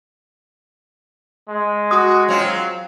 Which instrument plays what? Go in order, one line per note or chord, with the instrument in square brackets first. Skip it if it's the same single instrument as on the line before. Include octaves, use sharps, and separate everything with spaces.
[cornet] G#3
[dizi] F#4 [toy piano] D#6
[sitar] F#3 C4 F4 [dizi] F5